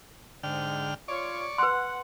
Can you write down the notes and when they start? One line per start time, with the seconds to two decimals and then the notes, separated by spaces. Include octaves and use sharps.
0.43 G#2 D3 G5 F6
1.08 F4 C#5 D5 C#6
1.58 B4 F#5 C6